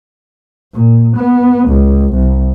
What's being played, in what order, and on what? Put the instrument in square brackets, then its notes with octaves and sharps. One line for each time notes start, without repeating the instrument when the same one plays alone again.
[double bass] A#2
B3
C#2
C2